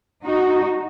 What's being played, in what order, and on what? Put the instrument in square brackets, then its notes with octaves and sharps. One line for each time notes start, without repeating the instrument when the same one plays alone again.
[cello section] D#4 F#4